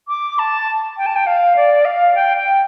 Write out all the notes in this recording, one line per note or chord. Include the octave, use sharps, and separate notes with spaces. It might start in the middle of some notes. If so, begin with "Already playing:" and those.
D6
A5
G5
A5
G5
F5
D5
F5
G5
G5